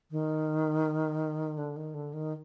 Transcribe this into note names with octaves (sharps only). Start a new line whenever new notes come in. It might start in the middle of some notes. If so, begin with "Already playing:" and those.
D#3
D3
D#3
D3
D#3